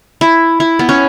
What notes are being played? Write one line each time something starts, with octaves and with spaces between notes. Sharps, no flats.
E4
E4
B3
C#4